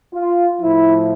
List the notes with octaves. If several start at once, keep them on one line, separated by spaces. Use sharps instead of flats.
F4
A2 F3 E4